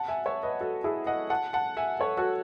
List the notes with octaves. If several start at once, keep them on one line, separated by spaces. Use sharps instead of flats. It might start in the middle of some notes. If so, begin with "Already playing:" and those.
Already playing: F#5 A5
E5 G#5
C#5 E5
B4 D#5
F#4 A4
E4 G#4
D#5 F#5
F#5 A5
F#5 A5
E5 G#5
A4 C#5
F#4 A4